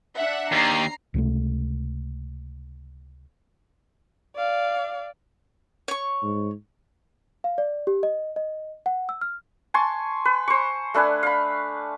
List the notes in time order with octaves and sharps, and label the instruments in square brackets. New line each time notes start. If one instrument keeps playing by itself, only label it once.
[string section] D4 E5 F#5
[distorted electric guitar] D#2 [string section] A#5 C7
[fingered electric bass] C#2 C3 E3 A3
[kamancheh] D5 F5
[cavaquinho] C#5 C#6
[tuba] G#2
[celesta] F5
D5
G4
D#5
D#5
F#5
E6
F6
[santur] G#5 A5 C6 C#6
B4
C5 C#6
A3 D4 B4 G#5
F5 B5